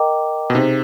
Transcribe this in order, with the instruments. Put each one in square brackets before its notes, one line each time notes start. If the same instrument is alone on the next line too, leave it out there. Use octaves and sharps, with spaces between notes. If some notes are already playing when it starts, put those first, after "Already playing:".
Already playing: [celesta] A#4 D#5 G5 A#5 D6
[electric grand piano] B2
[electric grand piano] C3 [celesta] D#4 G#4 C5